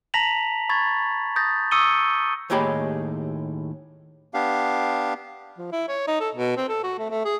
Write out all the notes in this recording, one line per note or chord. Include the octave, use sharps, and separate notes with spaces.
A5 A#5 A#6 B6 F7 F#7
B5 C#6 G#6 A6
D#6 G6 A6 A#6
C#6 D#6 E6 C#7 D#7 G7
D#2 A2 G#3 G4 C#5 B5
B3 D4 G4 F5
F3
E4
C#5
D#4
A4
B2
C4
A4
F#4
A3
A3
G#4